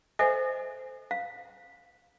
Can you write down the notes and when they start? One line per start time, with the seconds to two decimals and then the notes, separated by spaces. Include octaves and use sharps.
0.19 A4 C5 D#5 E5 G#5
1.11 F5